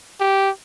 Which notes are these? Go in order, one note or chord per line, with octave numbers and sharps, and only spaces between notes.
G4